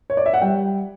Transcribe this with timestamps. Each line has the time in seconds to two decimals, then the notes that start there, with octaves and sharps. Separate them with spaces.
0.10 C#5
0.17 D5
0.26 E5
0.34 F#5
0.42 G3 G5